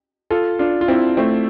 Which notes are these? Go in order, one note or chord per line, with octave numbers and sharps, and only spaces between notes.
F4 A4
D4 F4
F4
C4 E4
A3 C4